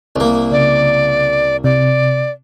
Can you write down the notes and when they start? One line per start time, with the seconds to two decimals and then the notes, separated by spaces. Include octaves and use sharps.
0.16 C2 A#3
0.52 C#3 D5
1.64 C3 D5